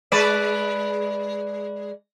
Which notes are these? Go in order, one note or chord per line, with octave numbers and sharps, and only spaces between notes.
G#3 B4 D5